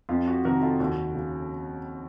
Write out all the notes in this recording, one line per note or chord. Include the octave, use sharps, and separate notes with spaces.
F2 F4
F#4
C3 D#3 F#4 A#4
F4 A4
D#2 F#4
C#3